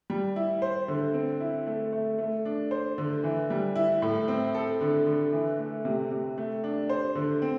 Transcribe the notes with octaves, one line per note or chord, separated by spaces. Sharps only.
G3
E4
C5
D3
C4
E4
A3
A3
A3
D4
C5
D3
E3
G3
E4
A2
C4
A4
D3
D3
E3
A3
C3
C3
A3
D4
C5
D3
C4